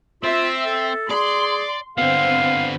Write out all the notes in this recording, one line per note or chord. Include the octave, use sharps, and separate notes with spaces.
C4 F4 E5
A4
G#4 D5 C6
D3 B3 C4 F5